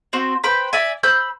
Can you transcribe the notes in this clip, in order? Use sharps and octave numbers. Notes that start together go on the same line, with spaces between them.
C4 F#4 C5
B4 C5 G5 B5
D5 E5 G#5
C5 B5 E6 G6